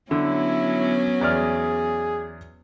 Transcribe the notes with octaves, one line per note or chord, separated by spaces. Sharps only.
D3 F#3 B3 C#4 E4
E2 G#4 D5 F6